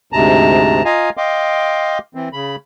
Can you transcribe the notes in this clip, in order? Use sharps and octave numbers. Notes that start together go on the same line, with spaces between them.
D2 G#2 C3 A5 A#5
F4 D#5 F5 G#5 A#5
D#5 F5 G5 C6 D6
E3 C4
C#3 B5